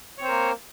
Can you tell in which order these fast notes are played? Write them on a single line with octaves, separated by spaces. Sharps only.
C#5 C4 C5 A#4 A#3